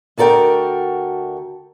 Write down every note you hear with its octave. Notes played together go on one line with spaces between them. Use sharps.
D2 F#4 A4 A#4 G5